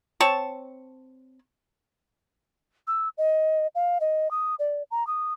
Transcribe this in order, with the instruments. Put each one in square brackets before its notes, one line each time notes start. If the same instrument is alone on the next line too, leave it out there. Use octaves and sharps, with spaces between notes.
[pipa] C4 C#5 A5 C#6
[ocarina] E6
D#5
F5
D#5
D#6
D5
A#5
D#6